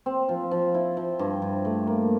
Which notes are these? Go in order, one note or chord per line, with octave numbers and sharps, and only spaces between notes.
C4
F3
F3
E4
F3
G2
G2
A3
A#3